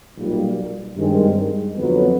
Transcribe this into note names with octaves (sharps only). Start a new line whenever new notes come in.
B1 A#2 G3 A#3
G2 D#3 G#3 C4
F2 D3 F#3 B3